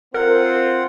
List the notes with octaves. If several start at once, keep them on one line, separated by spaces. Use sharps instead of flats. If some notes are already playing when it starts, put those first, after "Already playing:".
C4 F4 A#4 F#5